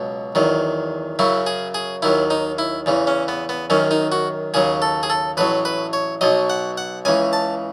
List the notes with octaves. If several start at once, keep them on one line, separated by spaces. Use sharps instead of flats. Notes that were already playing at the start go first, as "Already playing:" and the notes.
Already playing: C#2 B2 F#3
E2 D#3 F#3
F#2 C#3 F#3 E4
G#4
G#4
D#2 D#3 F#3 E4
D#4
E4
E2 C#3 E3
C#4
B3
B3
F#2 D#3 F#3 C#4
D#4
F#4
D#2 C#3 F#3 G#4
A4
G#4
A4
A1 A2 F#3 B4
B4
C#5
B1 B2 F#3 D#5
F#5
F#5
C#2 C#3 E3 G#5
A5